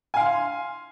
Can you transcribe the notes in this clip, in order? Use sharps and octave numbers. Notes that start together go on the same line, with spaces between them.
F5 G#5 C6